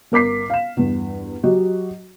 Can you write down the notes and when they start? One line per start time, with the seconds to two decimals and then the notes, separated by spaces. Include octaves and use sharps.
0.12 G1 A#4 D6 B6 C7
0.50 F5 E7
0.77 E2 G2
1.43 F#3 F#4 G4 D#5